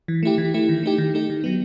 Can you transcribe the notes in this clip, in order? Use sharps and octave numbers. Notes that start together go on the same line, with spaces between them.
E3
A3 E4 G4
E3
A3 E4 G4
D#3
A3 D#4 G4
D#3
A3 D#4 G4
D#3
F#3 B3